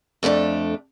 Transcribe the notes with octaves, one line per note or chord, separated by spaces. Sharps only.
F2 A3 C#4 D4